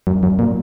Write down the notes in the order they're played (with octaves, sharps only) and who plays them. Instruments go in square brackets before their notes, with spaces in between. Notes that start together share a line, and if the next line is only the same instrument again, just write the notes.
[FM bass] F#2
F#2
A#2